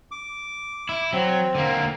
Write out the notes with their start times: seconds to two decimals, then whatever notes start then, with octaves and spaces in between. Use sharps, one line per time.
0.11 D6
0.89 E4
1.13 F#3 C4
1.55 D3 A#3